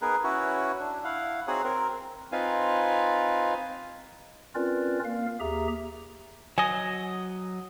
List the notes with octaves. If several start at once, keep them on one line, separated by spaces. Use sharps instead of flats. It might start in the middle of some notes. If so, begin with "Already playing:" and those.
B3 D#4 G#4 A#4 B4
C#4 E4 F#4 B4 C#5
D4
E4 F5 F#5
C4 D#4 F#4 G#4 C#5 F#5
C4 A#4
C4 D#4 F4 B4 F5 G#5
C4 C#4 F4 A#4 B4 D5
A#3 A#4 F5
D#2 G4 G#4 E5 A#5
F#3 D#5 G#5